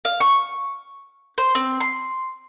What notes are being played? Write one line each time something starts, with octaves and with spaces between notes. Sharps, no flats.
F5
C#6
C5
C4
C6